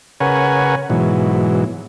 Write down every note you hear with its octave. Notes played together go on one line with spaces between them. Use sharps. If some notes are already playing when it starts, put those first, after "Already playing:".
C#3 A#4 B4 C#5 F#5 G#5
G#2 B2 E3 F#3